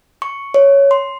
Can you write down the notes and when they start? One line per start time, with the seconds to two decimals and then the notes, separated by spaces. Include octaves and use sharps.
0.22 C#6
0.54 C#5
0.91 C6